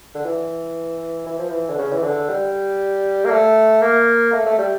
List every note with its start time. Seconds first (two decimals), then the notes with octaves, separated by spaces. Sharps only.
0.15 D3
0.25 E3
1.26 E3
1.39 F3
1.50 E3
1.70 D3
1.78 C#3
1.93 E3
2.04 D3
2.29 G3
3.25 A#3
3.30 A3
3.82 A#3
4.33 A3
4.46 A3
4.58 G3